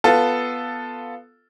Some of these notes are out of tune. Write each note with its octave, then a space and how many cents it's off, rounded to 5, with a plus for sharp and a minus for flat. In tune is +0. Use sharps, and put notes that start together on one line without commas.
B3 +0 F4 +0 A4 +0